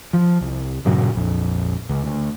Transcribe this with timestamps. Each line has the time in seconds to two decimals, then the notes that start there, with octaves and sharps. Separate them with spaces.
0.13 F3
0.41 C2
0.85 G2 A#2 C#3 F#3
1.13 A#1 F2
1.89 C#2
2.04 D2